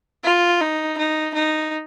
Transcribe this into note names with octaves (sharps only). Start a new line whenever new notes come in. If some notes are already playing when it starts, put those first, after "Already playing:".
F4
D#4
D#4
D#4